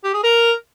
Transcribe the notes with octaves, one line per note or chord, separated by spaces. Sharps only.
G4
G#4
A#4